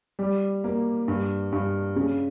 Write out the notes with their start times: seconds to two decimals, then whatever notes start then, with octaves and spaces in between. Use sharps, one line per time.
0.19 G3
0.64 A#3
1.08 G2
1.52 G2
1.96 C#3